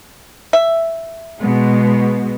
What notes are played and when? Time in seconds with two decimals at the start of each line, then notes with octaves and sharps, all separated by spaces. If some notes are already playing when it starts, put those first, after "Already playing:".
0.53 E5
1.40 B2 G#3 B3